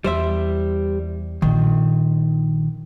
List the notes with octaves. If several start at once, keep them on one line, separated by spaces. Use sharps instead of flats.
E2 G3 C5 E5
A#1 D#3